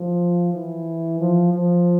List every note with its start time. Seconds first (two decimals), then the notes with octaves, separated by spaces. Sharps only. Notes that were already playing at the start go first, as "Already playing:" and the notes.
Already playing: F3
0.54 E3
1.20 F3
1.52 F3